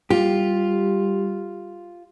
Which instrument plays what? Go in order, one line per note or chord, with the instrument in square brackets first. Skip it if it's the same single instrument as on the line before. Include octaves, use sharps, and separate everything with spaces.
[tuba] G3 [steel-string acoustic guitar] F4 [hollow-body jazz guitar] G4